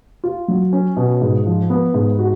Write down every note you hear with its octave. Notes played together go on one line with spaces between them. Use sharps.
F4
F#3
C#4
B2
G#2
F3
B3
G#2
F#4